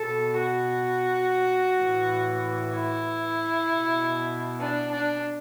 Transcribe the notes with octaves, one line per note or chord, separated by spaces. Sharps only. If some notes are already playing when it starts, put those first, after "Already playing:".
Already playing: B2 A4
F#4
A2 E3
E4
B2
D4
D4